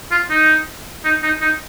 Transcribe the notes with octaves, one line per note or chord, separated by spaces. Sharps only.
F4
D#4
D#4
D#4
D#4